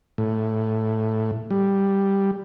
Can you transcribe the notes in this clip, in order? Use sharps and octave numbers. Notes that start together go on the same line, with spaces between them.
A2
G3